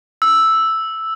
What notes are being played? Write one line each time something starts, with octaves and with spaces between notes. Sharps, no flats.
E6